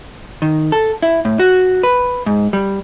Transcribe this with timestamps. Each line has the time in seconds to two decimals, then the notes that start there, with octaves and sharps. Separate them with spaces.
0.42 D#3
0.72 A4
1.02 E4
1.25 A2
1.39 F#4
1.83 B4
2.26 G#2
2.53 G3